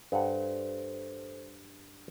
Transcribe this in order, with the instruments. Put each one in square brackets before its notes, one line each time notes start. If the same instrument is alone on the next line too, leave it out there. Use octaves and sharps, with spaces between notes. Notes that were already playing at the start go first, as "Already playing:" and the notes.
[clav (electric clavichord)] G2 F#5 [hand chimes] A4 C5